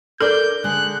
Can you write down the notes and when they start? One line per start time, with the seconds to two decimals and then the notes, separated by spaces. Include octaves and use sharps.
0.21 D4 A4 A#4 D5 G6
0.64 D3 G#3 F#6